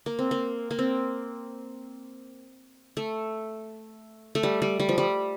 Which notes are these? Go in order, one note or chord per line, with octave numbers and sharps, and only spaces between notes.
A#3
C4
A#3
A#3
C4
A3
A3
G3
G3
G3
F3
G3